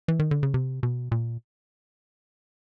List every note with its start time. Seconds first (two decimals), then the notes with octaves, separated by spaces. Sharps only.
0.08 E3
0.19 D#3
0.31 D3
0.43 C#3
0.54 C3
0.83 B2
1.12 A#2